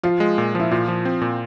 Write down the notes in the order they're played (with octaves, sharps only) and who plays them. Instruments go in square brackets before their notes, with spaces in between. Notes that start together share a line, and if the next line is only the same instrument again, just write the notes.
[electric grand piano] F3 [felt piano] F4
[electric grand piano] G#3
A#2
[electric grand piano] F3 [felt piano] E4
[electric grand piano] A#2 [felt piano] F4
[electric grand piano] F3
C4
A#2